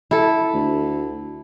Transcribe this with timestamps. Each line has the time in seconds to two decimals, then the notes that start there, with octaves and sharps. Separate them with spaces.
0.11 E4 A4
0.54 D2